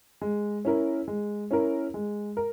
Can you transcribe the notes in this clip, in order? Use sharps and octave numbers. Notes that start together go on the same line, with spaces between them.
G#3
C#4 E4 A#4
G#3
C#4 E4 A#4
G#3
A#4